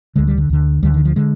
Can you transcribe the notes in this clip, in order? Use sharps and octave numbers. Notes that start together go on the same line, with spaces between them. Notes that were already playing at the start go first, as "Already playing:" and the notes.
D2 D3 G#3
G3
D3
D2 D3
D2 D3 G3
D#3
F3
D3 G#3